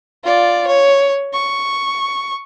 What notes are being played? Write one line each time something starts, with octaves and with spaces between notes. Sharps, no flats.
F4 D5
C#5
C#6